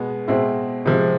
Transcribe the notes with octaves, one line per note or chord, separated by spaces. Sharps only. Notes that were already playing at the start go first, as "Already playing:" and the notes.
Already playing: B2 G#3 B3
B2 G#3 C4 E4
C3 F3 G#3